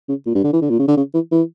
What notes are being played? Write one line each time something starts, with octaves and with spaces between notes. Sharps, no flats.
C#3
A#2
G2
D3
E3
D3
A#2
C#3
D3
C#3
E3
E3